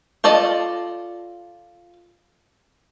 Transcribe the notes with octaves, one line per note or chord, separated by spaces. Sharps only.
F4 A4 D5 D#5